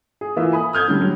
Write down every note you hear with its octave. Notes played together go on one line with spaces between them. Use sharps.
G#4
E3 A#3 F4 E5
G#5 B5 D#6
D#6 F6 G6 G#6
D3 G3 C#4
F#3 G3